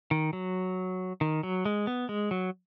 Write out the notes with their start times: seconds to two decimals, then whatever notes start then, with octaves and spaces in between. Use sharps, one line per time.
0.11 D#3
0.33 F#3
1.21 D#3
1.43 F#3
1.65 G#3
1.87 B3
2.09 G#3
2.31 F#3